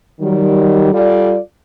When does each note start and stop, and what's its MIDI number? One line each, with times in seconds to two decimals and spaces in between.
0.20 0.93 51
0.20 0.93 54
0.20 0.93 55
0.93 1.38 55
0.93 1.38 65
0.93 1.38 69
0.93 1.38 74